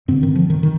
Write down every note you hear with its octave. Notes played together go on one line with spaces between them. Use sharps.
G2 D3 C4
D#3
F3
D#3
D#3